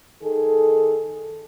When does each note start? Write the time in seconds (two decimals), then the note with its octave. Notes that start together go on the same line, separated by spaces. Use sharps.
0.23 D#3 G#4 A4